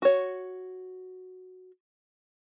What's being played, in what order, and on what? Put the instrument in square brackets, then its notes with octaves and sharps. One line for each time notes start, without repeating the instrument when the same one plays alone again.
[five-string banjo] F#4 C#5